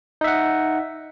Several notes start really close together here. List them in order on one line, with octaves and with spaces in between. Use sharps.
D#4 E5 F#5